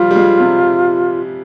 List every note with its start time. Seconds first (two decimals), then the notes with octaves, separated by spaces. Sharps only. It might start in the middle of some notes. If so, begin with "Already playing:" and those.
Already playing: F3 G3 F4
0.11 G3
0.16 G#3
0.40 C3